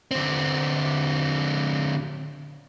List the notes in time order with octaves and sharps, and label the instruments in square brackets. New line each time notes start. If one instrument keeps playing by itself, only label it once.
[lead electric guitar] D3 C4